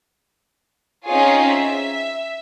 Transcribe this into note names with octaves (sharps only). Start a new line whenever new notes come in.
C4 C#4 D#4 F4 G#4 C#5
E5